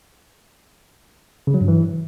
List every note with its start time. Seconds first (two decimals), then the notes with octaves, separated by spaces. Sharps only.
1.47 C#3
1.54 F#3
1.61 G2
1.68 E3